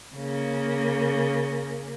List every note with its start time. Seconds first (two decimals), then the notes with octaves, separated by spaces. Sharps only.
0.15 C#3 A#3